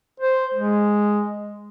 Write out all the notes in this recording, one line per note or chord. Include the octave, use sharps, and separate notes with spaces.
C5
G#3